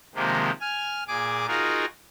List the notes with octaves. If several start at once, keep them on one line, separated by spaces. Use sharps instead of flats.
C3 D#3 F3 G#3 A#3 G4
G#5 F6
A#2 G#4 G#5 D6
D#4 F4 F#4 G#4 A#4